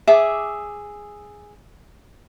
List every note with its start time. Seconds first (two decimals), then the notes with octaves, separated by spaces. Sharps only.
0.07 G#4 E5 D6